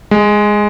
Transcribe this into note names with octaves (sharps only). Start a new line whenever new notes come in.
G#3